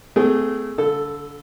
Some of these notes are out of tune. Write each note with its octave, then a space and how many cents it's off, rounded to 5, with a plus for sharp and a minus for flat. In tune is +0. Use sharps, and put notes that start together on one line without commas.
A3 +0 C4 -40 G#4 +0
D3 -35 A4 +0